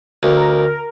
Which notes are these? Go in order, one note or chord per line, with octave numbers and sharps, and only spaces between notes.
D2 A#4